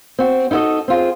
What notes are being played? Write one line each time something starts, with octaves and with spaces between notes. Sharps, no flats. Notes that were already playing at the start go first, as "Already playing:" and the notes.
C4 F#4
D#4 E4 F#4 A4 D#5
C4 F4 G#4